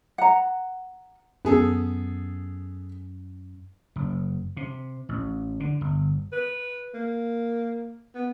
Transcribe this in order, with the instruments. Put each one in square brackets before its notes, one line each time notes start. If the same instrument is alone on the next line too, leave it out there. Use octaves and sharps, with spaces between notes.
[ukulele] F#5 A#5
[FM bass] F#2 [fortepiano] B3 G#4 A4
[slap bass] F#1
C3
A1
D3
G1
[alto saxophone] B4
A#3
B3